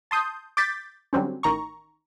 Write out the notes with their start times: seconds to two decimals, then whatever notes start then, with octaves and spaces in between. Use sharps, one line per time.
0.11 A5 C6 D#6 G6
0.57 D6 G6 A6 B6
1.13 D3 F#3 G3 C4 C#4
1.43 A1 D#3 A#5 C#6